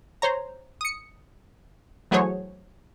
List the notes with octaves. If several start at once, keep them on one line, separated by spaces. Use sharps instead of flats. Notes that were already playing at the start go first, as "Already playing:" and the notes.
C5 C#5 A#5
D#6 C#7
E3 F#3 A3 G#4 C5 C#5